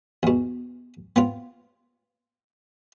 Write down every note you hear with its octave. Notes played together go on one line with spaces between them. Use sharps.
E2 B2
B3 C4 F4